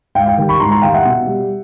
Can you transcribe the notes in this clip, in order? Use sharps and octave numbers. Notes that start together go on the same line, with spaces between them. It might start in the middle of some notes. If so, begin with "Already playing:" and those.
G#2 F5 G5
F5 G5
D#3 G3
B5 C#6
G#2 A#5 C6
A#5 C6
D#3 G3 F5 G5
E5 F#5
B2
G3